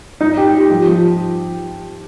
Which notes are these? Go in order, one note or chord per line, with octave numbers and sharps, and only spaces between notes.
D#4
G4
G4
F3
F3